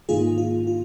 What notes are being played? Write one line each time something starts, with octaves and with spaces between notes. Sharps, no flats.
G#2 D#3 A#3 D#4 F4 G#4
F4
F4